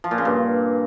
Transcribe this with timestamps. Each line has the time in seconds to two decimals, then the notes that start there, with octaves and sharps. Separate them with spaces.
0.04 F3
0.11 A#2
0.18 C#3
0.25 G2